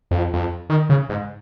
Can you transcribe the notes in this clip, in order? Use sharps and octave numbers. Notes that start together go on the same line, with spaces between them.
F2
F2
D#3
C#3
G#2